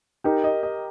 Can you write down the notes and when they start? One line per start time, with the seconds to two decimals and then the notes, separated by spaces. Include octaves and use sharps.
0.24 D#4 G4 A#4
0.44 D#5
0.63 D#5